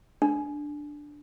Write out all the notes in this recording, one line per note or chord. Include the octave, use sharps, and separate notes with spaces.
D4